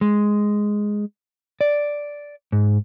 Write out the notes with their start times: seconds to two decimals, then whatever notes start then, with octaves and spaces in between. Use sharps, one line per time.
0.01 G#3
1.61 D5
2.52 G#2